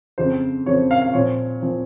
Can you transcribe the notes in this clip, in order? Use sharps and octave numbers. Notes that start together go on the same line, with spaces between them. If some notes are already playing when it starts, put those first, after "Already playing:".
F2 C#3 F3 C4 C5
F2 C#3 F3 C4 C#5
F5
F5
A#2 F3 C4 C#5
A#2 F3 C4